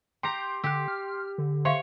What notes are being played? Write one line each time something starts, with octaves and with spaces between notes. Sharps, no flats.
G4 G5 A#5 C6 D6 G6
D3 G4 E6 F#6
F6
D3
C5 C#5 E5 F5 C6 C#6